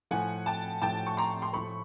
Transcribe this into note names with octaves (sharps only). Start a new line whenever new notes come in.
A2 F3 A3 F#5 G#5
G5 A5
A2 F3 A3 G5 A5
C#6
A#5 C6
C6
A2 F3 A3 B5 C#6